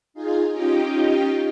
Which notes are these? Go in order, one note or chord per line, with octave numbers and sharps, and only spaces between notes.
D#4 F4 G#4
C#4 D#4 F4 G4 D#5 G5